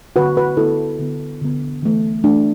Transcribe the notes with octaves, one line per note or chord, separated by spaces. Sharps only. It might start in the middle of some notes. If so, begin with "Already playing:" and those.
D3 B3 F#4 B4
F#4 B4
D3 B3 E4 A4
D3 B3
D3 B3
E3 A3
E3 A3 D4